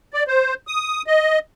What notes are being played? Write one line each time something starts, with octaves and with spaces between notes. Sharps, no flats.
D5
C5
D#6
D#5